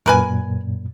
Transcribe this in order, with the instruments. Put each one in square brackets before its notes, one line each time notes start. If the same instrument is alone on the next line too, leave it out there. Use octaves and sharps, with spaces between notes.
[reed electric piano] F#2 A#2 [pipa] A#4 B4 G#5